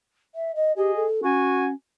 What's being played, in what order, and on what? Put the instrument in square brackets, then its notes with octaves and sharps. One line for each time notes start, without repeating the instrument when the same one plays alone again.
[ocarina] E5
D#5
[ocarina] G4 [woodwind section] G#4 D#5
[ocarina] A4
[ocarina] C#4 [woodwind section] F#4 G#5